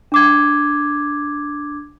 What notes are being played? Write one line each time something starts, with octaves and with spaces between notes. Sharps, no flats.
D4 D6 G#6